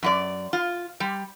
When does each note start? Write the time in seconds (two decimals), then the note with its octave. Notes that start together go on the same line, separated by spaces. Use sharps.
0.03 F#2 F4 D5
0.53 F4
1.00 G3